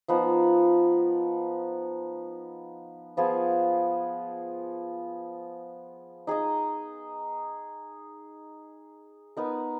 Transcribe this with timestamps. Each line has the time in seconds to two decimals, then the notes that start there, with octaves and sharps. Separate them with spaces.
0.08 F3 B3 D#4
3.17 F3 B3 F4 G#4
6.27 D#4 G#4 D#5
9.37 B3 D#4 A#4